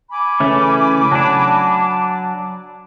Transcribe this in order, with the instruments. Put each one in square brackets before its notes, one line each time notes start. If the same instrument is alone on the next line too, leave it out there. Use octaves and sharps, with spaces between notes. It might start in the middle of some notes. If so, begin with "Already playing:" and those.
[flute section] G#5 B5 D6
[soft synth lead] C#3 [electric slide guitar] E3 A3 C#4
[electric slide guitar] F#3 D4 [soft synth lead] A5